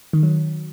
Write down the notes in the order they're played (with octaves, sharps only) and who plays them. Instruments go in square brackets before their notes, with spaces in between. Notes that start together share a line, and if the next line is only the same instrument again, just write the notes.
[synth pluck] D#3
F#3